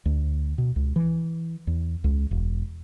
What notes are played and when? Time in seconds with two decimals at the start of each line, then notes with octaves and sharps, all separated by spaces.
0.06 D2
0.58 B2
0.76 C#2
0.96 E3
1.67 E2
2.04 C#2
2.31 E1